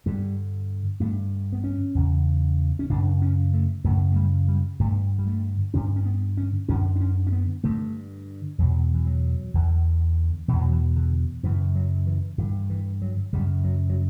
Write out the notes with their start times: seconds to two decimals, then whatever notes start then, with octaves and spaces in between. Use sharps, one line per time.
0.06 G2 D3 G3
1.00 G2 D3 A3
1.53 B3
1.64 C#4
1.95 E2 C#3
2.79 C#4
2.90 F#2 C#3 D4
3.22 C#4
3.53 A3
3.84 F#2 C#3 A3
4.12 A3
4.16 G3
4.48 G3
4.80 G2 D3 A3
5.19 G3
5.27 A3
5.74 G2 D3 C#4
5.96 C#4
6.05 B3
6.37 C#4
6.69 F#2 D3 C#4
6.96 D4
7.01 C#4
7.27 C#4
7.32 B3
7.64 G2 D3 A3
8.58 E2 B2 F#3
8.94 E3
9.07 F#3
9.54 E2 D3
10.48 E2 B2 E3
10.60 F#3
10.72 E3
10.96 D3
11.43 F#2 C#3 E3
11.75 F#3
12.07 E3
12.38 G2 E3
12.43 D3
12.70 E3
13.02 F#3
13.33 F#2 C#3 G3
13.64 F#3
13.89 F#3